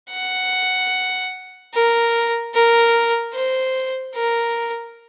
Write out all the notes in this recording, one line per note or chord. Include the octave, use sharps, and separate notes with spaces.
F#5
A#4
A#4
C5
A#4